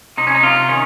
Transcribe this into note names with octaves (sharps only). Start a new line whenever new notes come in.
C3 D#4
C#4
D#4
C3 F4
D#3 C#4